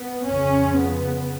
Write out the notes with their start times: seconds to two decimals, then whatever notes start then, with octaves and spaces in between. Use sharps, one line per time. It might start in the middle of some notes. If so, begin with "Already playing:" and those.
Already playing: B3
0.24 F2 C#3 C#4
0.77 B3